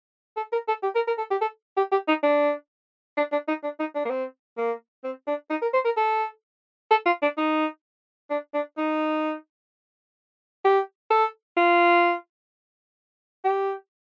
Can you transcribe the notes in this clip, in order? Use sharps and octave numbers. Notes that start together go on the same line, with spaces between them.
A4
A#4
A4
G4
A#4
A#4
A4
G4
A4
G4
G4
D#4
D4
D4
D4
D#4
D4
D#4
D4
A#3
C4
A#3
C4
D4
D#4
A#4
C5
A#4
A4
A4
F4
D4
D#4
D4
D4
D#4
G4
A4
F4
G4